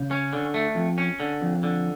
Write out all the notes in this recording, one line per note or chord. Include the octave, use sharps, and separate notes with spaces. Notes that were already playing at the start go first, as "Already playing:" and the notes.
Already playing: C#3
C#4
D3
A3
F2
C#4
D3
F2
D3